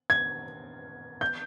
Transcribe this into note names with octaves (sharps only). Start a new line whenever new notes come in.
G#6
G6